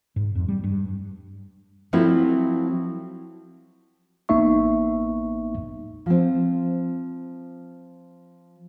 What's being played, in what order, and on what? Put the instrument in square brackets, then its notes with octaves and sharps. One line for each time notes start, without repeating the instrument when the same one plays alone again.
[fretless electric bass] G#2
F2
G3
G2
[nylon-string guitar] F3 F#3 A3 C4 E4
[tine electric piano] A1 A#3 B3 D#4 E5 C#6
[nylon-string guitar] F3 C4